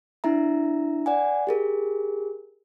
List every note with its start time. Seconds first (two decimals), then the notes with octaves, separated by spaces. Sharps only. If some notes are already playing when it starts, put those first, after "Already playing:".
0.24 D4 E4 E5 A#5
1.06 D5 F#5 G#5
1.47 G4 G#4 A#4